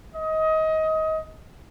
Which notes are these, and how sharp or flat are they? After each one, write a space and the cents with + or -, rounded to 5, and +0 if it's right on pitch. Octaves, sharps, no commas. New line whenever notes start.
D#5 +25